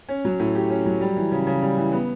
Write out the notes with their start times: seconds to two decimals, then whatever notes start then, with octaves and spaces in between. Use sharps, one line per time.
0.09 C#4
0.25 F#3
0.40 A2
0.55 G4
0.70 C#4
0.86 F#3
1.01 G3
1.16 E3
1.32 C#3
1.47 C#3
1.62 G3
1.78 E3
1.92 B3